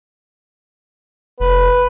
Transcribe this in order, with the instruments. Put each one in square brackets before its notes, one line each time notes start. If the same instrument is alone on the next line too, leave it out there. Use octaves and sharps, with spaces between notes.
[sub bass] F1 [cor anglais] B4